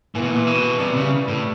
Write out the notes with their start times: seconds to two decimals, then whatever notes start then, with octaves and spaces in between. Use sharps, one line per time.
0.15 A#2 E3
0.22 B2
0.30 A#2
0.36 E3
0.47 B2
0.58 E3
0.79 C3 G3
0.96 C#3 G3
1.22 G3
1.28 A2